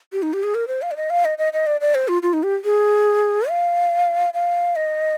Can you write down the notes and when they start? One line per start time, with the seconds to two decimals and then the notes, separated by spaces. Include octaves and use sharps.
0.13 G4
0.23 D#4
0.33 G4
0.43 G#4
0.55 A#4
0.68 C5
0.82 F5
0.91 D5
0.97 D#5
1.10 F5
1.25 D#5
1.38 D#5
1.53 D#5
1.67 D5
1.81 D5
1.95 C5
2.08 F4
2.23 F4
2.33 D#4
2.43 G4
2.65 G#4
3.49 F5
4.34 F5
4.76 D#5